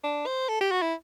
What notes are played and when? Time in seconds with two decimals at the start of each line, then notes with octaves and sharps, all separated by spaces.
0.04 D4
0.26 C5
0.49 A4
0.61 G4
0.72 F#4
0.82 E4